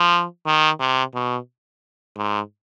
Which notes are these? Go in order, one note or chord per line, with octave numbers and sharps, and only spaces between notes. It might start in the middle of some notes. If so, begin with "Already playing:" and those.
Already playing: F3
D#3
C3
B2
G#2